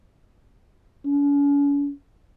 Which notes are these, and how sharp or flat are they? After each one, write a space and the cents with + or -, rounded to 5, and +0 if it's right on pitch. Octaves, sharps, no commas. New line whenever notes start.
C#4 +45